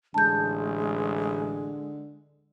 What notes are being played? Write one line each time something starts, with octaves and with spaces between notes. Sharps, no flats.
A1 D3 G#3 A5 G6